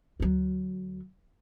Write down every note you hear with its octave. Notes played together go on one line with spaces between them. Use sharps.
D2 F#3